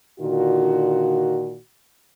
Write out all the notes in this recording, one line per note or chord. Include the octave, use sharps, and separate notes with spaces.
A#2 D3 D#3 F4 F#4